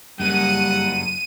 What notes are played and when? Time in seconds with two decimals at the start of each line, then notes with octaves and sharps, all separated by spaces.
0.20 F#2 G3 A#3 F#5 D#7